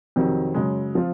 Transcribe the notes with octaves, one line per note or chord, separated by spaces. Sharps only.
F2 C3 D#3 F#3 C4
F#2 C#3 G#3
F3 C4 F4